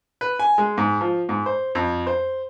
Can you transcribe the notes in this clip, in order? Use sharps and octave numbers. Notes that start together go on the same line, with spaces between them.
B4
G#5
G#3
G#2
F3
G#2
C5
F2
C5